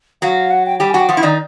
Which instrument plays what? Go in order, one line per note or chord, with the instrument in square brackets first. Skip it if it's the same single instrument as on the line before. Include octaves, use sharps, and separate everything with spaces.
[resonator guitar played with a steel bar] F#3 F#4 [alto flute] F5
[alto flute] F#5
G5
[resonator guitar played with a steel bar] G3 G4 [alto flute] G5
[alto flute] G#5
[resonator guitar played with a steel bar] F#3 F#4 [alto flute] G5
[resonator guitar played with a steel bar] F3 F4 [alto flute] F#5
[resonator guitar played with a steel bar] E4
[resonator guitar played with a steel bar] D#3 D#4 [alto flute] D5